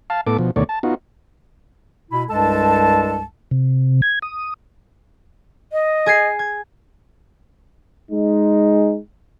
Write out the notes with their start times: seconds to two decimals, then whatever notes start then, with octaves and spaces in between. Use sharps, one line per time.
0.10 F5 A5
0.27 A2 B3 A4 D6
0.38 B2 F3
0.56 D2 B2 D#3 A3 C#5 D5
0.69 A5
0.83 B3 D#4 F4 F#4
2.11 B2 E4 B5
2.30 C2 G2 G#3 A4 A5
3.51 C3
4.02 G#6
4.22 D#6
5.72 D#5
6.06 G#4 G#6 C7
6.39 G#6
8.10 G#3 D#4